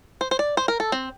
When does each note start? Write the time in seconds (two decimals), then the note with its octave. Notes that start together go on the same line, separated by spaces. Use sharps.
0.21 C5
0.31 C5
0.39 D5
0.57 C5
0.68 A#4
0.80 A4
0.92 C4